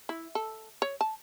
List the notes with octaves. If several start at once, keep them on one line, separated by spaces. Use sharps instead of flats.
E4
A4
C#5
A5